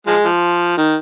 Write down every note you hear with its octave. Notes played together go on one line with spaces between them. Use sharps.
F3 G#3
F3
D#3